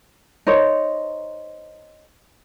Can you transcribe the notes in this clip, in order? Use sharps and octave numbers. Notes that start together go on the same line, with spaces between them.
D#4 A#4 C5 C#5